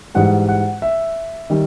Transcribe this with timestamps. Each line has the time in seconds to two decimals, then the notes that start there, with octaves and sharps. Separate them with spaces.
0.15 G#2 E3 G3 F#5
0.49 F#5
0.82 E5
1.50 D#3 G3